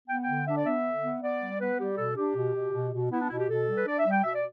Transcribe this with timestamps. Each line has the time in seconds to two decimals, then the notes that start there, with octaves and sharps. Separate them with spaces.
0.09 B3 G5
0.23 D3 G5
0.46 D4 E5
0.57 D5
0.66 B3 E5
0.84 D3
1.03 B3
1.22 B3 D5
1.41 G3
1.60 B3 B4
1.79 G3 G4
1.97 B2 A4
2.16 D4 G4
2.35 B2
2.54 B2
2.73 B2
2.92 B2
3.10 B3 E4
3.21 D4
3.29 B2 E4
3.39 G4
3.48 B2 A4
3.67 G3
3.77 B4
3.86 D4 D5
3.99 E5
4.06 G3
4.11 G5
4.24 B2 E5
4.35 D5